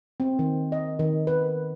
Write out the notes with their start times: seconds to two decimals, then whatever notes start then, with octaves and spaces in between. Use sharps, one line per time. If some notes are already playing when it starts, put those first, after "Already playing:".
0.20 C4
0.39 D#3
0.72 D#5
0.99 D#3
1.27 B4